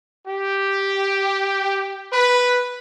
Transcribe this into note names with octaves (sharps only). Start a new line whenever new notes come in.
G4
B4